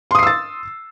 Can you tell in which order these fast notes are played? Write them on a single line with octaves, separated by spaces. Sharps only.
C6 D#6 C7 E6 A6